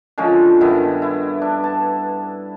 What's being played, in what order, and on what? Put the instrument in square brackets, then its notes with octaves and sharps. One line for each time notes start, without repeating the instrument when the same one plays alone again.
[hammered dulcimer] D3 F3 G#3 C#4
G2 D#3 B3 E4
E4
D4
A5